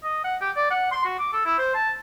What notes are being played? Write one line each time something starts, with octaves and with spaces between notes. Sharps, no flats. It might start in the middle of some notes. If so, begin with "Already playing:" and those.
D#5
F#5
G4
D5
F#5
C6
F#4
D6
A4
E4
C5
A5